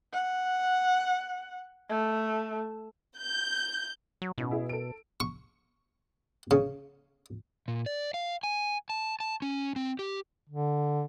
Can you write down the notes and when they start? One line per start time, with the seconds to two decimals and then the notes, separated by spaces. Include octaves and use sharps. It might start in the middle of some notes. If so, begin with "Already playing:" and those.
0.13 F#5
1.89 A3
3.20 G6
4.22 F#3
4.38 A1 B2 C#4 D#4
4.51 E4 G#4
4.69 A4 D7
5.20 C#6
6.51 C#3
7.68 A#2
7.86 D5
8.14 F5
8.43 G#5
8.90 A5
9.20 A5
9.42 C#4
9.76 C4
9.99 G4
10.49 D3